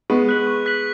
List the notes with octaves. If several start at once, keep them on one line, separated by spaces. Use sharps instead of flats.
G#3 B3 C#6
F#6 B6 F#7
C#6
F#6 B6 F#7